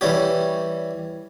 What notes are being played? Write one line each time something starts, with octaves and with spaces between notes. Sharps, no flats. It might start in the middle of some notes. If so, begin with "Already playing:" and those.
E3 G3 C#4 G4